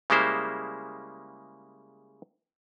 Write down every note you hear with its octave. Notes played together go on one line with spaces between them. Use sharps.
C#3 G3 G#3 A#3 E4 C5